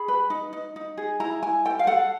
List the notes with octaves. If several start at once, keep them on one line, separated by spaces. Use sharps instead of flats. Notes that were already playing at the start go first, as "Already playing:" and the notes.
Already playing: G#4 B5
B4
D#4
D#4
D#4
G#4
E4 A#5
E4 G#5
A4 G5
F5
A4 F#5